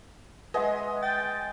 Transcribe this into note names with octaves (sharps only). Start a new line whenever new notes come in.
G#3 G#4 B4 D#5 E5 F#5
G5 A6